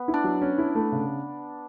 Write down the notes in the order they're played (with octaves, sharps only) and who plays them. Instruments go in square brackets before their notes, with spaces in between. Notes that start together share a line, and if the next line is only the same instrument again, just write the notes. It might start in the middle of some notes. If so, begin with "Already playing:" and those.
Already playing: [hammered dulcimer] B3
[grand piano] E4
[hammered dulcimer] D4
[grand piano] F#3
C#4
E4
A3
C#3